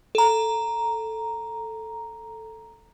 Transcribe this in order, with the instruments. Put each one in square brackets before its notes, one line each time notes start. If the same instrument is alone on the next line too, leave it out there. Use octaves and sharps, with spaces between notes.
[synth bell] A4 A#5